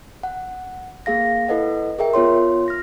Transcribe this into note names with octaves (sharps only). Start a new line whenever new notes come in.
F#5
A#3 G#4 F5 A#6
E4 A4 B4 D#5 F#5
G#4 A#4 E5 G5
B3 F4 C#5 C6
F6 A#6